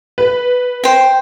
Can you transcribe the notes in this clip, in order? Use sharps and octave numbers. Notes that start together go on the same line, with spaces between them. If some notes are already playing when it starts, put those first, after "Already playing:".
B4
C5 G5